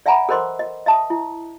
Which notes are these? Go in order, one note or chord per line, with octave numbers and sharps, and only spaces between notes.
D5 E5 F#5 G#5 A#5 B5
A4 A#4 C5 D#5 C6 D6
D#5
D#5 E5 A5 D#6
E4